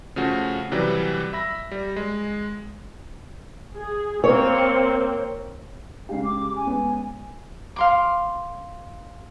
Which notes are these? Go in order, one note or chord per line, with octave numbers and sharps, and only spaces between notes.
C#3 F3 A3 C#4 F#4
C3 E3 F#3 G3
E5 B5 A#6
G3
G#3
G#4
A#3 C4 C#5
C#3 G#3 G4 F5
D6
G#5
G#3 B3 C#4
F5 C6 D6